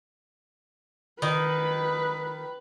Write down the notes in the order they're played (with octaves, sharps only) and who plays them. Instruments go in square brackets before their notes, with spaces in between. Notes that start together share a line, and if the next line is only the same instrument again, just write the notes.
[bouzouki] D#3 [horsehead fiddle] B4